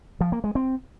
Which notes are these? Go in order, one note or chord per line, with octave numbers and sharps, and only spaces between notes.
F3
A#3
G#3
C4